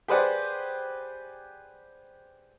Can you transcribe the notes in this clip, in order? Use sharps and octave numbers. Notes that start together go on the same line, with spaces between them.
G4 G#4 B4 C5 D5 F#5